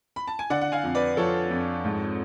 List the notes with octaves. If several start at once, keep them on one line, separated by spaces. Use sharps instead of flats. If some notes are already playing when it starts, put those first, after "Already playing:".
B5
A5
G#5
D3 D5 F#5
F#5
F5 G#5
F2
B4 D5
F3 A4 C#5
F2
G#2